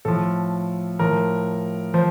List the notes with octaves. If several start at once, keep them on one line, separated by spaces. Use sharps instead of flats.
A2 F3 A4
A2 F3 A#4
F3 C5